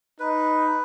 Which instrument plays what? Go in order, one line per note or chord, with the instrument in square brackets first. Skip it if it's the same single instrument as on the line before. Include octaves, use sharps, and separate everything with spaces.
[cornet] D#4 [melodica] B4